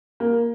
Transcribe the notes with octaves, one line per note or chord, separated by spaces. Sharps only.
A#3